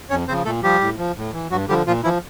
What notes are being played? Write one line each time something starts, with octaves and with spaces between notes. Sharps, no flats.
F2 C#4 C#5
C#3 F3 C4 C5
A#2 A3 A4
F3 G3 G4
A2
F3
A2
E3
G2 F#3 F#4
D3 F3 G3 G4
A#2 F3 F4
E3 F3 E4